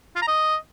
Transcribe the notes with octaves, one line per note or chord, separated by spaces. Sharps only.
F4
A#5
D#5